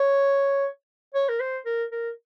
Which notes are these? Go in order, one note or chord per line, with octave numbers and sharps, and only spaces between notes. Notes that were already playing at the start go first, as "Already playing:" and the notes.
Already playing: C#5
C#5
A#4
C5
A#4
A#4